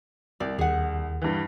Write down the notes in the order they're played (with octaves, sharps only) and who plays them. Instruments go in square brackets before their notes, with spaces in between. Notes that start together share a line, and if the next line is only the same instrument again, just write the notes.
[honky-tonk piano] C2 [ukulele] D5
[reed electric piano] D#2 [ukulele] G#4 F#5
[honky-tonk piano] G2 E3